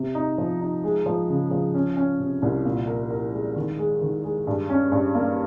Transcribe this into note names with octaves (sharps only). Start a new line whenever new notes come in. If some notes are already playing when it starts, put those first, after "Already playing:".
Already playing: C3
D#4
F3
D#4
G#3
F3
C#3
F3
C#4
C#4
C3
C2
A#2
A#4
A#4
G#3
D#3
G#3
D#3
G#3
G2
C#4
G2
A#3